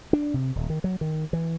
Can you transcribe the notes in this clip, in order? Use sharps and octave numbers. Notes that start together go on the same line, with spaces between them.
D4
C3
D#1
D#3
F#3
D#3
E3